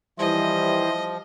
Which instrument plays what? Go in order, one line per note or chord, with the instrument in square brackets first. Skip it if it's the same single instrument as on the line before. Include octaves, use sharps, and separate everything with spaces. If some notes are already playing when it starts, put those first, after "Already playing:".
[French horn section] E3 G3 [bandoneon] F3 [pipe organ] E4 C5 [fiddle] D#5